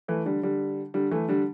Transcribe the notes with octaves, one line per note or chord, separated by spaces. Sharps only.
E3 A3
D3 G3
D3 G3
D3 G3
E3 A3
D3 G3